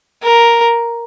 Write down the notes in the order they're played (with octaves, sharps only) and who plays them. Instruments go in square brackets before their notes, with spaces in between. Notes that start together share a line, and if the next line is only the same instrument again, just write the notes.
[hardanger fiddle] A#4